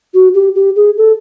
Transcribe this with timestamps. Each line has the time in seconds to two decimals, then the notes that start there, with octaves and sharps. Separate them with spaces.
0.14 F#4
0.34 G4
0.55 G4
0.76 G#4
0.97 A4